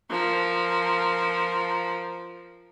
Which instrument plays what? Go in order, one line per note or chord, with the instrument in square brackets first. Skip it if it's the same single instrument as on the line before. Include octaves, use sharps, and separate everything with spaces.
[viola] F3 A#4